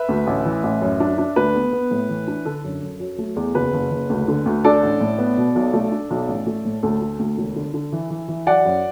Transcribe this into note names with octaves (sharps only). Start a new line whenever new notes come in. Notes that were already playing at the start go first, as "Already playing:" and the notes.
Already playing: B4 E5
D2
A1
E3
A1
F#2
D4
D4
D2 B4
B3
B3
A2
E3
D4
D3 A4
F#2
F#2
F#3
A3
E2
F#1 B4
F#1
F#1
D2
D3
D2
D4 A4 D5
A1
A2
B3
B2
B1
A3
D4
B1
A1
A3
A2
D2 A4
A3
D2
E1
D3
D3
E3
E3
E3
F#3 D5 F#5
F#2